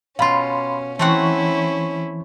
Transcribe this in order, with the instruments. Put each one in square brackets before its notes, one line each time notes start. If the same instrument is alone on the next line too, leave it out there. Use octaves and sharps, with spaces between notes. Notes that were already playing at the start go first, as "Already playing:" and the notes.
[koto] B2 F4 [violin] C#4 [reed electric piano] F5 B5 C6
[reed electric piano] E3 C#6 [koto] A3 C4 F#5 [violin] C#4 E4